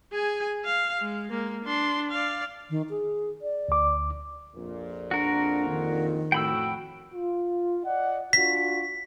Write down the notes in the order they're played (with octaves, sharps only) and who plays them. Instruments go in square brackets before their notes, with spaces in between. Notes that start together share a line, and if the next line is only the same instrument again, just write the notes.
[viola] G#4 G#5
F5
G#3
G#3 A#3
D4 C6
D5 F5
[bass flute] D#3
G#4
D5
[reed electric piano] D2 D6
[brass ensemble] A#1 F2 A#2
[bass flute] D4 [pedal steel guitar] F#4 A#4
[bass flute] D#3
[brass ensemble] F2 A2 F#4 [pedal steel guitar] G5 B5 E6
[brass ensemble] F4
D5 D#5 F#5
[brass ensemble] D4 F4 F#4 [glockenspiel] B6